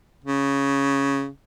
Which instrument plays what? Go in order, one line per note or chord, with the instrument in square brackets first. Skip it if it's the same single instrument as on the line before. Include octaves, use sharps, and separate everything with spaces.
[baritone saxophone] C#3